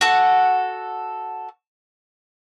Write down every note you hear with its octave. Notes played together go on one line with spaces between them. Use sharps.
F#4 A4 F#5